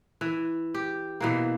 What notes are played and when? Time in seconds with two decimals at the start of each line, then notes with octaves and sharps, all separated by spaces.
0.21 E3
0.74 G4
1.20 B2 E3 A#3